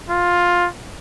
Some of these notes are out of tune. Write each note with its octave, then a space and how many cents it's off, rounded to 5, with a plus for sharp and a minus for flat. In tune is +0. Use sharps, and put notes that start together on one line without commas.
F4 +10